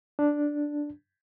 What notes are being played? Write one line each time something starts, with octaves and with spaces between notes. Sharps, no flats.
D4